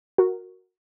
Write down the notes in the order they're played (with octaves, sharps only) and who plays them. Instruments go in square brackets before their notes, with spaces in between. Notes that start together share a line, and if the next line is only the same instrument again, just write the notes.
[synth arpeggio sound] F#4 A#4